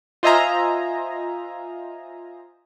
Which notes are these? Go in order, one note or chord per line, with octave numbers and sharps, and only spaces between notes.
F4 C5 D#5 E5 G#5 A#5